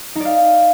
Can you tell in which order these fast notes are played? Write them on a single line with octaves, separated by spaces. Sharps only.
D#4 D5 F5